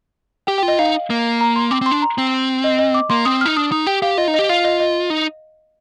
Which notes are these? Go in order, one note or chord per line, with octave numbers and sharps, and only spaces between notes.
G4 G5
G5
F4
D#5
D#4 F5
A#3
A#5
C6
C4 D6
C4 C6
D4
A#5
C4
D#5
D#5
D6
A#3 C6
C4 D#6
D#4 F6
D4 D#6
D#4 D#6
G4 G5
G4 F5
F4 D#5
D#4
G4 D#5
F4 F5
D#5
D#5
D#4